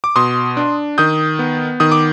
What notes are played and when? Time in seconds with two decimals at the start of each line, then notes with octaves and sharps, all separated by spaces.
0.04 D6
0.16 B2 C6 D#6
0.57 D4
0.98 D#3 D#6 G6
1.39 B3
1.80 D#3 D#6
1.92 D6